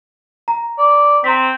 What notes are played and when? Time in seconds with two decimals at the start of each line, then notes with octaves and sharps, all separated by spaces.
0.48 A#5
0.79 D5
1.24 C4 A#5 C6 B6